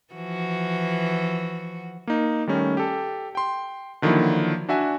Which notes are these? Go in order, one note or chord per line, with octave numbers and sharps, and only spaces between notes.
E3 F3 F#4
A#3 D#4
D#3 G3 A3 C#4
G4 A4
G5 C6
D3 D#3 F3 F#3 A#3 E4
D4 F#4 E5 G#5